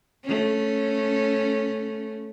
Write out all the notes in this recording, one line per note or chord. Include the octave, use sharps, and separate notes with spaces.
A3 C#4